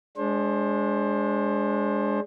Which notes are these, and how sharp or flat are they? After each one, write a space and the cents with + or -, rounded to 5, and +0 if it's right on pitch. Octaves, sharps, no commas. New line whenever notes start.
G#3 +0 D4 -20 C5 +25